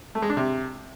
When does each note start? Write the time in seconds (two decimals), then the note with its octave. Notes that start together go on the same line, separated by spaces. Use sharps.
0.15 A3
0.22 G#3
0.30 D4
0.37 C3